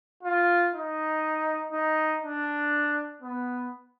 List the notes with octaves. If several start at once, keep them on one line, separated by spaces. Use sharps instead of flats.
F4
D#4
D#4
D4
B3